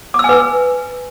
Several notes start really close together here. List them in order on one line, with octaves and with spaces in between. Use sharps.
D6 E6 G#5 B4